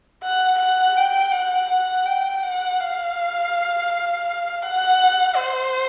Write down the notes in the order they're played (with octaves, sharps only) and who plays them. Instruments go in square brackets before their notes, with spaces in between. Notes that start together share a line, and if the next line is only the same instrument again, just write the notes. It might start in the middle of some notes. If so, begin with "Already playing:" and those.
[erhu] F#5
F#5
G5
F#5
F#5
G5
F#5
F5
F#5
C5